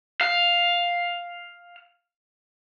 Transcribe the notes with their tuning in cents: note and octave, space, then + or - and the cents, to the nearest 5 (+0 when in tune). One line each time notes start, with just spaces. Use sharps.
F5 +5